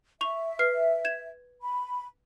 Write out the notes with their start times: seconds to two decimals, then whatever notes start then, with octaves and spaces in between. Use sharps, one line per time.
0.21 E5 C#6 F7
0.59 B4 F6 C7
1.04 G6 G#6 E7
1.62 B5